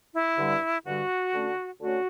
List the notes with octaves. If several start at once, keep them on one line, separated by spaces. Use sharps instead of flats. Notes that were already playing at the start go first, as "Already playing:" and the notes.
E4
G2 D3 G3
G2 D3 G3 F#4
D3 A3 C#4
D3 A3 C#4 F#4